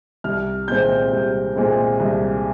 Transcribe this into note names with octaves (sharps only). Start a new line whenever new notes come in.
C2 F6
A#2 G#3 C4 G6
C2
A#2 G#3 C4
C2